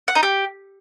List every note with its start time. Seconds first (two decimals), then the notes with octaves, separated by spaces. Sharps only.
0.08 F#5
0.15 D#4
0.23 G4